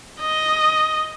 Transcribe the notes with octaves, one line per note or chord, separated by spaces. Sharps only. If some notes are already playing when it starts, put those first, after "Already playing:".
D#5